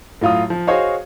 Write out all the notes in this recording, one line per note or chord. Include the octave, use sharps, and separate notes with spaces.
A2 F#3 F4 F5 D#6
F3
F#4 G#4 C5 C#5 D#5 F5